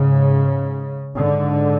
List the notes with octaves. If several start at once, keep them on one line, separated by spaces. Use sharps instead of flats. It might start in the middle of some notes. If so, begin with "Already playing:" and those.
Already playing: G#2 C#3
G#2 D3